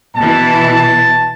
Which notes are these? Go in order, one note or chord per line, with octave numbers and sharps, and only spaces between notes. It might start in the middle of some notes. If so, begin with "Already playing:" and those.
B2 E3 A5